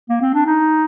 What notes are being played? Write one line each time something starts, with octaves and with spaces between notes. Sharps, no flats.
A#3
C4
D4
D#4